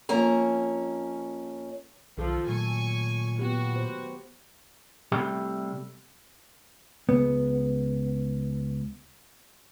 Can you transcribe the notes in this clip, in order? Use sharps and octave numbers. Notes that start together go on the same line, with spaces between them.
F2 A#3 C#4 A#5
B1 D#3 F3 A4
A#2 F#3 A3 G#5 C#6
B3 F#4 G4
C5
C3 G3 A3
C#2 B3